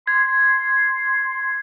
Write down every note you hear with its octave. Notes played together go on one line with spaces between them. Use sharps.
C6 G#6